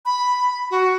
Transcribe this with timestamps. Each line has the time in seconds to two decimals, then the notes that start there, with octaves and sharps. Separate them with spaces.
0.06 B5
0.71 F#4